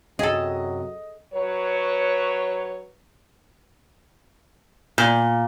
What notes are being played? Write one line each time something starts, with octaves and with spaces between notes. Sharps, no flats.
F#2 C3 F#3 G#4 A4 D#5
F#3 B4 C#5
A#2